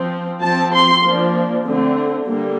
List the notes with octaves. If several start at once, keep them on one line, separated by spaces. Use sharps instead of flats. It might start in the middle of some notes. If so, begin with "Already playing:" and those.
Already playing: F3 C4
F3 C4 A5
C6
F3 A#3 D4
D3 A3 C4
D3 G3 A#3